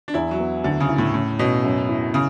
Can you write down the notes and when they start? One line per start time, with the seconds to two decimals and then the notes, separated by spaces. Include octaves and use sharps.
0.08 D4
0.14 E2 E4
0.31 F#3
0.40 B3
0.64 D2 D3
0.80 C#3
0.89 E4
0.98 A2
1.14 A2 C#3
1.39 B2 C#4
1.64 F#2
1.89 E4
2.14 C#3